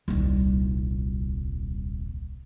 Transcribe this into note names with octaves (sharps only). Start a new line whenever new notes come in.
D#1 C2